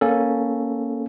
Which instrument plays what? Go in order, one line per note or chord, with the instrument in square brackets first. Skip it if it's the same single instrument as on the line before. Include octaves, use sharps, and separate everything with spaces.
[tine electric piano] A#3 C#4 A4